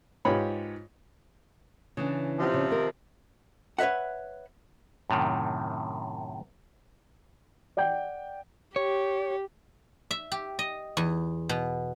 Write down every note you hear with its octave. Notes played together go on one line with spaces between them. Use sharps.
G#2 F4 G4 B4 C#5 B5
C#3 E3 D4
C3 F3
C#3
D#3 A#4
B4 C#5 D#5 E5 F#5
F#2 A2 C3 D#3
D5 F#5 G5 G6
G4 C#5
E5
G4
D#5
E2
B2